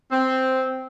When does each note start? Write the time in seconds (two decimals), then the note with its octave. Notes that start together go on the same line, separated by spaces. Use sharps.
0.12 C4